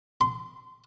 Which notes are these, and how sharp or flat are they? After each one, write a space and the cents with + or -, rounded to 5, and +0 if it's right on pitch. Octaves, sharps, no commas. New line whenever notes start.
C6 -25